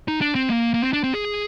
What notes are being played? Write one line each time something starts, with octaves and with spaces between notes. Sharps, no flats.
D#4
D4
C4
A#3
A#3
C4
D4
C4
G#4